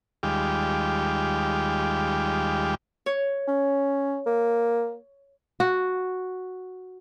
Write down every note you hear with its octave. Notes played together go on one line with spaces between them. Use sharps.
D#2 G3 G#3 F4 G4 D6
C#5
C#4
A#3
F#4